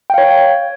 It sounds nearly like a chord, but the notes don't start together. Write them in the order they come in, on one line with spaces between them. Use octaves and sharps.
G5 F5 C#5